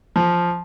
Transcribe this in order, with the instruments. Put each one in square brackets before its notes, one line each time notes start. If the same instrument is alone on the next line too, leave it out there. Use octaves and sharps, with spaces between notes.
[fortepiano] F3